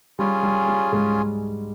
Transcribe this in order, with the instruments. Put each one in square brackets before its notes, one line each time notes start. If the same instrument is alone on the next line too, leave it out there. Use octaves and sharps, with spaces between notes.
[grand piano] G3 [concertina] C#4 F4 G#4
[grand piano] G3
G3
G#2 G#3